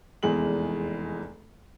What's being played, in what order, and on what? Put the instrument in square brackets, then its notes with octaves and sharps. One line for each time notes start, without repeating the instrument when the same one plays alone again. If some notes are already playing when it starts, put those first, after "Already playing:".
[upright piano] F1 E2 G#3 F#7